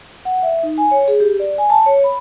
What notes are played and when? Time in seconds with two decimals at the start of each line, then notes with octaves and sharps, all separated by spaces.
0.25 F#5
0.43 E5
0.63 D#4
0.78 G#5
0.91 C#5
1.08 G#4
1.20 G4
1.40 D5
1.58 G#5
1.70 A5
1.86 C#5
2.04 B5